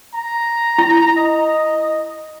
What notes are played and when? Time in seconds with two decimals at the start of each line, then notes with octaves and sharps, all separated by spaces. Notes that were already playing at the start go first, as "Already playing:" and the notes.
0.15 A#5
0.78 E4
1.16 D#5